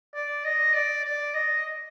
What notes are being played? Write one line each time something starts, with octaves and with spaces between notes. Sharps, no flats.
D5
D#5
D5
D5
D#5